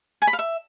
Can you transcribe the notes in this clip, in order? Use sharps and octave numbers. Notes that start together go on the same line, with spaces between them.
G#5
B5
F5
E5